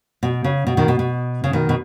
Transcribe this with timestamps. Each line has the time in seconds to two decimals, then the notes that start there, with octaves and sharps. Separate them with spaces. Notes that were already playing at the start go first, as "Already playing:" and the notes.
0.23 B2
0.44 C#3
0.67 B2
0.77 B2 D#3
0.88 B2
0.99 B2
1.44 C#3
1.53 B2 D#3
1.69 B2